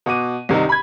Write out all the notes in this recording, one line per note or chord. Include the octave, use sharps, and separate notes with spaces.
B2 F#5 D6 D#7
C2 C3 D#3 D#4
B5 G#6